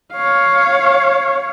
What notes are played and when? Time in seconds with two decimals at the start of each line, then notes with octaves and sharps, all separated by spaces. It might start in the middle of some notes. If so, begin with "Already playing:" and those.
0.14 C#5 F5